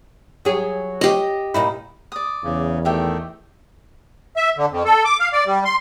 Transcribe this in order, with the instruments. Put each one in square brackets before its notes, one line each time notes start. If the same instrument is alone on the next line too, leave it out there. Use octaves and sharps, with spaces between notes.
[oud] F#3 G#4
[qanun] G4 D#5
[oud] A#2 D#4 E4
[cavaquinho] D5 D#6
[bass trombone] E2 [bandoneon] C#3
[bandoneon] D#3 A3 [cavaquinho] G4 E5 G5
[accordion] E5
D3
F2
A4
D6
F5
D5
G3
C6